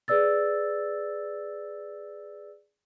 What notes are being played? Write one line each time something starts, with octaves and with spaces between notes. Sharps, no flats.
G#4 B4 D5 E6 A6